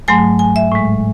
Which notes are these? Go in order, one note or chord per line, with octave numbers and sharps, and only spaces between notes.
G#2 F#3 A3 G#5
G#5
E5
A2 G#3